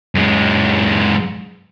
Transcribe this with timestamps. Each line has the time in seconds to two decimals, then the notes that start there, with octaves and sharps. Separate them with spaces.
0.15 F#2 G#3